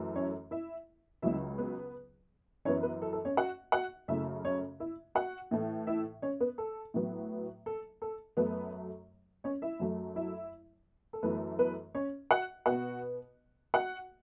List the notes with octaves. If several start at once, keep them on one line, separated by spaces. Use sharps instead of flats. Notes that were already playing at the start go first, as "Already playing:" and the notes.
Already playing: F#2 E3 A3
C#4 C#5
E4 E5
C#2 C#3 F#3 E4 E5
B3 B4
F#2 E3 B3 C#4 C#5
B3 B4
A4
A4
C#4 C#5
F#4 F#5
F#4 F#5
F#2 C#3 A3 E4 E5
C#4 C#5
E4 E5
F#4 F#5
A2 E3 A3
E4 E5
C#4 C#5
B3 B4
A4
A2 F#3 B3
A4
A4
F#2 F#3 A3 B3 B4
C#4 C#5
E4 E5
F#2 F#3 A3
E4 E5
A4
F#2 E3 A3 B3 B4
B3 B4
C#4 C#5
F#4 F#5
B2 B3 F#4 F#5
F#4 F#5